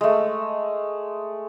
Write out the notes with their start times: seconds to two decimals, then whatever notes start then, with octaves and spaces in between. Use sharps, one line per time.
0.01 G#3 A3